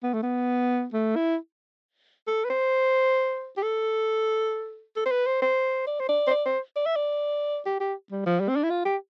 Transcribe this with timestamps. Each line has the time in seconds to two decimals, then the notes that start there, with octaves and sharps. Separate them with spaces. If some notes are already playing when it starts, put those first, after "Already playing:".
0.03 B3
0.14 A3
0.23 B3
0.93 A3
1.16 E4
2.27 A4
2.45 B4
2.50 C5
3.57 G4
3.62 A4
4.96 A4
5.06 C5
5.11 B4
5.27 C5
5.42 C5
5.87 D5
6.00 C5
6.09 D5
6.27 C5
6.31 D5
6.46 C5
6.76 D5
6.86 E5
6.96 D5
7.66 G4
7.80 G4
8.11 G3
8.26 F3
8.40 G3
8.48 C4
8.56 D4
8.63 E4
8.70 F4
8.85 G4